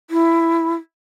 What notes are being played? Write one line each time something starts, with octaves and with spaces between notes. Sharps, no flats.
E4